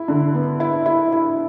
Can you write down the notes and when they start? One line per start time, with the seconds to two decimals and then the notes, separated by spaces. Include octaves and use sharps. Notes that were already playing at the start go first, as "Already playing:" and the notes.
Already playing: E4
0.08 D3
0.35 B3
0.60 E4
0.86 E4
1.12 E4